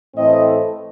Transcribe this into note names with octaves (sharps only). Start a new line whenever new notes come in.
A2 E3 A3 C4 D#5